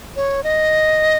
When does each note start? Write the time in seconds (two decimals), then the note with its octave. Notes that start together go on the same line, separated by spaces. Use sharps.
0.16 C#5
0.44 D#5